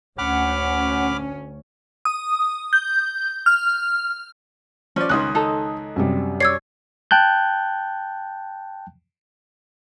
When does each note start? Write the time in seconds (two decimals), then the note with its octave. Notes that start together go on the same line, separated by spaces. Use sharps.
0.18 D2 C#4 F#5 B5 D6 F6
2.05 D#6
2.73 G6
3.46 F6
4.96 F3 C#4 D5
5.09 C#2 D#3 C6 D#6 F#6
5.35 D#4 A4 A5
5.96 F#2 C3 G3
6.40 C#5 D5 E6 G#6 C7
7.11 G5 A5 F#6 G6